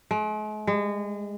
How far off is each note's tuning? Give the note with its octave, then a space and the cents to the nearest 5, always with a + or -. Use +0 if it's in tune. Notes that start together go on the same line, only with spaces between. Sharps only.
G#3 +45
G#3 -30